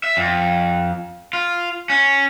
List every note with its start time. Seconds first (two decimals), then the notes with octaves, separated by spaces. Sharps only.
0.04 E5
0.17 F2
1.33 F4
1.90 C#4